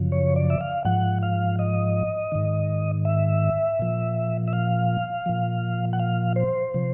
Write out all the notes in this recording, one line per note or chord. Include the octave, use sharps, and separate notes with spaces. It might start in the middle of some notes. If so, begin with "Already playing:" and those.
Already playing: F#2 C#3 F3
C#5
D5
E5
F5
G#2 F3 F#5
F5
D#5
G#2 D#3
E5
A#2 F3
E5
F5
A#2 F3
F#5
F5
C5
C3 F3